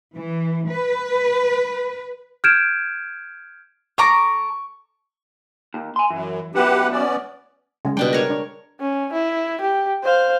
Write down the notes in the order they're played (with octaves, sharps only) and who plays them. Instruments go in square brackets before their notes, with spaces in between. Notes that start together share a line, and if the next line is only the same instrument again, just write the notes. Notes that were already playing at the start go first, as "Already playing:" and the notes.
[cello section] E3
B4
[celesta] F6 G6 G#6 D7 E7
[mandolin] A4 A#5 D6 [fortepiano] C#6
[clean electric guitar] D#2
G#5 C6
[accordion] F#2 [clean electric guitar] E3
[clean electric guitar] F#2 B2 E4 [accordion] G4 B4 F#5
[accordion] B3 C#4 D5
[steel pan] C#3 G#3
[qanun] B2 D4 G5 [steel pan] G3
[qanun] A#4 C#5
[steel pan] D4
[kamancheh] C#4
E4
G4
C5 F5